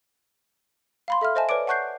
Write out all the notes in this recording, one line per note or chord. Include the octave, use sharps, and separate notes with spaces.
F5 B5 C6
A4 E5 F5 F6
C5 D#5 E5 G#5 A5
B4 C#5 D5 D6 D7
F#5 A5 C#6 F#6 G6 C7